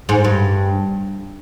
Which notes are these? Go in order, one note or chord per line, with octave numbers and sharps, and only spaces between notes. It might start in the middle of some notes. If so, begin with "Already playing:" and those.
G#2
G2